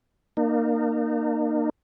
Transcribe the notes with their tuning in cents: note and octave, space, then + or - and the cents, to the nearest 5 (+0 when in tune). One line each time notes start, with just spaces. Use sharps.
A#3 +0 D#4 -40